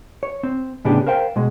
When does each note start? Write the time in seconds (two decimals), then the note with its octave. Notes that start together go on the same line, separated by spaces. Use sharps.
0.23 C#5
0.43 C4
0.85 A2 C#3 B3 C#4 D4 G4
1.07 A#4 C5 F5 G5
1.36 B2 G#3